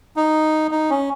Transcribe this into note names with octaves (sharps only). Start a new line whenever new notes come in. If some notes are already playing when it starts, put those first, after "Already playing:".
D#4
D#4
C#4